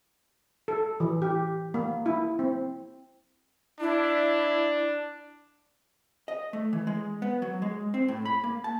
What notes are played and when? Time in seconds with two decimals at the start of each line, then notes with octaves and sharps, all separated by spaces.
0.68 A4
1.00 E3
1.22 G4
1.74 A#3
2.06 E4
2.39 C4
3.80 D4 E4
6.28 D#5
6.53 A3
6.73 E3
6.87 G#3
7.22 B3
7.42 F#3
7.62 G#3
7.94 C4
8.08 A2
8.25 B5
8.44 A#3
8.64 A5